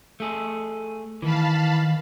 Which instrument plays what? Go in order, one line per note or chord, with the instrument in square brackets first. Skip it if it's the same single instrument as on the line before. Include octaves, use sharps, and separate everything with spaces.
[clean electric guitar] A3 G#4 A4
[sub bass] D#3 [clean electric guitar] E3 [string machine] F5 A5 B5